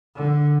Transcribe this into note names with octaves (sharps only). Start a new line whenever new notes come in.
D3